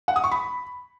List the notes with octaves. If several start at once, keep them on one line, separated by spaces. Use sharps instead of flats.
F#5
D#6
C#6
B5